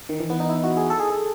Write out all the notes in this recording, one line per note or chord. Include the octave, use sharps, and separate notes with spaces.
D#3
E3
B3
D#4
E4
F#4
G#4
A4
G#4
A4